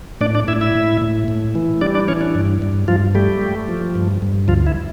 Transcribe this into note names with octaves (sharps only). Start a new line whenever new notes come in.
A2 D4 D5
D4 D5
A2 E4 E5
E4 E5
A2
A2
A2
E3
G3 D4 D5
D4 D5
E3 C#4 C#5
D4
G2
G2
G2 F3 F4
G3 A3 G4
A3
F3
G2
G2
D2 F3 F4
E4